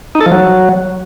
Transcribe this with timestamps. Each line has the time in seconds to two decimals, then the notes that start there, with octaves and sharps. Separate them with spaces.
0.15 D#4
0.21 A4
0.26 F3
0.32 F#3